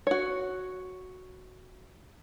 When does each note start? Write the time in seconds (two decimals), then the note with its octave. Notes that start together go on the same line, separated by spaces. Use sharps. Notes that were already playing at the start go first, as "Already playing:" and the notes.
0.07 F#4 C#5